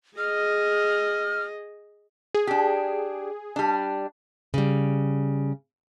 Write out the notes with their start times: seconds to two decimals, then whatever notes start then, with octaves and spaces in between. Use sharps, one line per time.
0.18 G#4 D#5 F6
2.34 G#4
2.47 D4 G4
3.56 G3 D4
4.54 C#3 G3